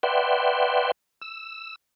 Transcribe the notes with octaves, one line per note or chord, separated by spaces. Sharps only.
B4 D5 E5 F#5 G5 C6
E6